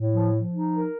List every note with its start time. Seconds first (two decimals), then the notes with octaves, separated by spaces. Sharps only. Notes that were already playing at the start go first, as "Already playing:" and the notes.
Already playing: A2
0.13 F3
0.34 F3
0.53 D#4
0.74 A#4